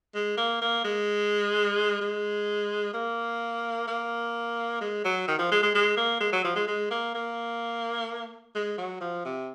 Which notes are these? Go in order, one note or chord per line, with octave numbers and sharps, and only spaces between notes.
G#3
A#3
A#3
G#3
G#3
A#3
A#3
G#3
F#3
D#3
F3
G#3
G#3
G#3
A#3
G#3
F#3
F3
G#3
G#3
A#3
A#3
G#3
F#3
F3
C3